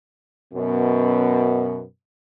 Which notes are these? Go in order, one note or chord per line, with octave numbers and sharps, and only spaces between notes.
F#2 B2